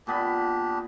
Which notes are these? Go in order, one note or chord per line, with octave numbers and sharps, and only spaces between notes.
A#2 B3 D4 G4 B5